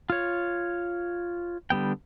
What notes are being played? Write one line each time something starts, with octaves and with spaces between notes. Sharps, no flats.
F4 C#5
D3 G3 B3 G5